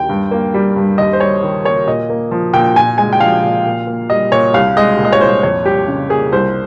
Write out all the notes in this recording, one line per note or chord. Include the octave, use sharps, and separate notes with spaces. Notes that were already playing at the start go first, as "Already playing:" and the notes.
Already playing: D#2 G5
G2
A#3
G3
G2
D#2 D#5
C5
G3 C#5
D#3
A#3 C#5
A#2 D#5
A#3
F3
A#2 G5
A#2 G#5
G#3 G#5
G5
F3 F5
A#2
A#2
A#3
G3 D#5
A#2 C#5
C2 F5
G#3 D#5
A#2
D#5
C#5
C2 C5
F2 C#5
G3 G4
C#3
A#3 G#4
C2 C5